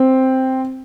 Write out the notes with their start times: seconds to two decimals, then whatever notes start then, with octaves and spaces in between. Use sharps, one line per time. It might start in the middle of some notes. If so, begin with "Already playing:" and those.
Already playing: C4